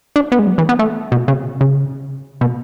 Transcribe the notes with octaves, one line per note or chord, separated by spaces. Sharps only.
D4
B3
G#3
F#3
E3
B3
A3
B2
C#3
C#3
B2